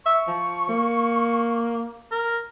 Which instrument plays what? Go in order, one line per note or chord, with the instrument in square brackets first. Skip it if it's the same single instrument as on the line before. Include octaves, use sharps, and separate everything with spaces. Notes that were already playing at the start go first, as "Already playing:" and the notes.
[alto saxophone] E5 [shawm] C#6
[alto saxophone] F3
A#3
[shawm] A#4